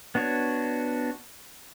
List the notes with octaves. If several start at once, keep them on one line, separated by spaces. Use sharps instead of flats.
B3 D4 F#4 C#5